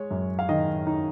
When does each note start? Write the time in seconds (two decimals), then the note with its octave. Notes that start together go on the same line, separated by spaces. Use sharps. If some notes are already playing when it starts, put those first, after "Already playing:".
Already playing: G#3 C#5
0.11 F#2
0.39 F5
0.49 D#3 D#5
0.87 D#4